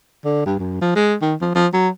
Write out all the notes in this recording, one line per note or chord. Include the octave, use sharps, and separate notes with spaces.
D3
G2
F#2
F3
G#3
D#3
F3
F3
F#3